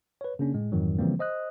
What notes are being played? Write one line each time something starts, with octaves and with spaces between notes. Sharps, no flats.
B4 C#5
C#3 A#3 C#4 D4
A2 G#3
F2 G#2 D#3 E3 F#3
C#3 E3 F3 G3 A#3 C4
C5 D#5 D#6 F#6